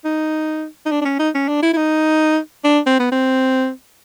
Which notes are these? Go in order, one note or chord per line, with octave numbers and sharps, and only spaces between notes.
D#4
D#4
D4
D4
C#4
D#4
C#4
D4
E4
E4
D#4
D4
C4
B3
C4